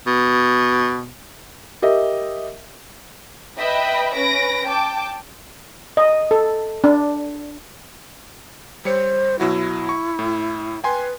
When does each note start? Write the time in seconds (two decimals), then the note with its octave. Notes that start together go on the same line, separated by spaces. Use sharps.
0.07 B2
1.82 G4 A#4 D#5 E5
3.58 B4 D#5 E5 G5 B5
4.15 C#4 B4 A#6 D7
4.65 G5 A5 D6
5.97 D#5
6.31 A4
6.84 D4
8.85 G3 C5 C#5 C#7
9.40 B2 F#3 E4 F#4
9.89 C#6
10.19 A2
10.84 B4 G5 G#5 C6